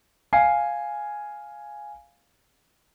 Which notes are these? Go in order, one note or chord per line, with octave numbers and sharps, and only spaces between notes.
F5 G#5 C7